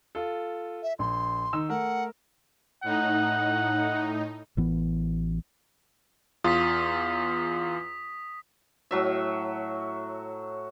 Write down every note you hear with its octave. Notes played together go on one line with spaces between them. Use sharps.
F4 A4
E5
A#1 C6
D#3 D#4 E6
A3 A#4 F#5
A2 D#4 F#5
A1 E3 B3
E2 F4 D#6 B6
A2 F#3 E5